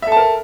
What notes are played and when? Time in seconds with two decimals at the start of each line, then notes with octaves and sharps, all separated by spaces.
0.02 E5
0.07 A4
0.12 A5
0.17 A#4